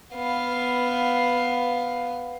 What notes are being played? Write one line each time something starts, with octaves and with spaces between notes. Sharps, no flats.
B3 F5